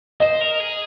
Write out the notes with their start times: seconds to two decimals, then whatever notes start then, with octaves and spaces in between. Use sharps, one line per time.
0.20 C5 D#5
0.40 A#4
0.60 G#4